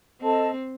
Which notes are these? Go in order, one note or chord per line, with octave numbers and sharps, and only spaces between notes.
C4 A4 D#5 A5